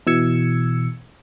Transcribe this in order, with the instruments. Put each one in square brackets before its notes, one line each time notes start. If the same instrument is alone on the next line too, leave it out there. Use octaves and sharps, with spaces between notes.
[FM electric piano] B2 E3 E6 G#6 C#7